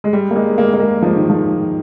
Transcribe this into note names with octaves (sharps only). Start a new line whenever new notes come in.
G#3
G3
A#3
G#3
A#3
A#3
G#3
F3
D#3
F3